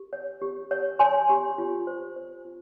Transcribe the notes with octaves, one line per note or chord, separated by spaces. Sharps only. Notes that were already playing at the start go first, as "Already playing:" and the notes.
Already playing: G4
C#5
G4
C#5
C#5 G#5 C6
G4
F4
C5
C5
F4